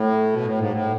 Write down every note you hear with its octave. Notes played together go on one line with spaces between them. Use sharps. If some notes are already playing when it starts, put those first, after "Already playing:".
Already playing: A2
B2
A2
G#2
A2